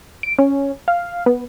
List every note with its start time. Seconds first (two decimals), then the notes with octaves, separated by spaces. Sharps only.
0.23 D7
0.39 C#4
0.88 F5
1.26 B3